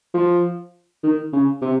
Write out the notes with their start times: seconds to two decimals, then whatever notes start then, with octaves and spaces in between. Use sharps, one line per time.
0.14 F3
1.03 D#3
1.33 C#3
1.62 C3